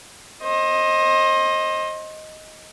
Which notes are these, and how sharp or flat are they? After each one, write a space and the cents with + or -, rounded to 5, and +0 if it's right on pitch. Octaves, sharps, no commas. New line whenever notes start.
C5 +30 D#5 +5